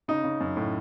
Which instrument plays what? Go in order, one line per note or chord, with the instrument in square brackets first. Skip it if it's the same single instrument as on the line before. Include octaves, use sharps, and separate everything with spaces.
[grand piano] C#3 D#4
C#3
F#2
A2